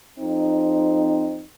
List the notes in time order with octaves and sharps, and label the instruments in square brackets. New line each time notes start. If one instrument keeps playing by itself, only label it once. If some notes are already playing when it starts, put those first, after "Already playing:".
[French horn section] F2 C4 D#4